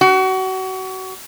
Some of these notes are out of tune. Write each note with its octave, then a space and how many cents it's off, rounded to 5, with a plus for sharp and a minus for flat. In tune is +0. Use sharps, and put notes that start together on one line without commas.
F#4 +30